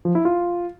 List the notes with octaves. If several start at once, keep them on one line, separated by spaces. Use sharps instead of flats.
F3
E4
F4